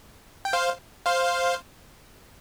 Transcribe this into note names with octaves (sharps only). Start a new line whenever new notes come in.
G5
C5 F5
C5 F5